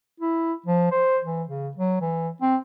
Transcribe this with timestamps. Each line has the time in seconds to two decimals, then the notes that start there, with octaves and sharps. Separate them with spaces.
0.20 E4
0.66 F3
0.92 C5
1.25 E3
1.49 C#3
1.77 F#3
2.01 E3
2.42 C4